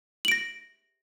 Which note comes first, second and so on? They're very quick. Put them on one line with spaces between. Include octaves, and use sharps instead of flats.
F#7 D7 A#6